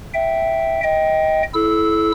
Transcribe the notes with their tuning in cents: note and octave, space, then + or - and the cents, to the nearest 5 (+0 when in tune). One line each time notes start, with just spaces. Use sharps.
E5 +0 G5 -5
D#5 +20 G5 +0
E4 +0 A4 -30 E6 -10